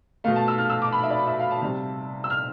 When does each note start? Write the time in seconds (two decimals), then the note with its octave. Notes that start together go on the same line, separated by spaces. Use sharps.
0.24 B2 A3 F5
0.36 A5
0.48 E6
0.58 F6
0.70 E6
0.82 D6
0.93 B5
1.03 E5
1.10 D5
1.27 E5
1.39 F5
1.51 A5
1.62 C3 G3
2.24 E6
2.30 F6